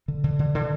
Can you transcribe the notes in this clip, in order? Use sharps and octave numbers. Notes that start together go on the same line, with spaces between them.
D3
D3
D3
D3